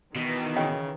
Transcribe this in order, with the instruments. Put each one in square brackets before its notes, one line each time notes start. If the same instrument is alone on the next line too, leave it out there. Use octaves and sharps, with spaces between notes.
[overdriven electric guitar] B2 [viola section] D#3 E3
[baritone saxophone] C#3 [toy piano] D#5 G5